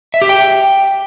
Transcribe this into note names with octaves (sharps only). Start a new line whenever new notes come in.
E5
G4
G5